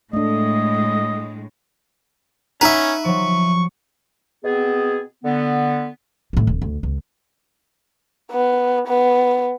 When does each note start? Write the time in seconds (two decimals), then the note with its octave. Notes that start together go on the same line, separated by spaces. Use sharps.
0.13 A2 G#3 A3 D4 D#5
2.61 C#4 D#4 B4 E5 F#5 A#5
3.05 F3 F#3 C#6
4.44 B2 B3 C4 G#4
5.24 D3 B3
6.33 A2 D#3
6.47 D1
6.62 D2
6.83 C#2
8.31 B3
8.87 B3